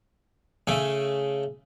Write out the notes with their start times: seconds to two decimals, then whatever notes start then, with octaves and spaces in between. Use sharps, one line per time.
0.67 C#3 A3 E5 G#5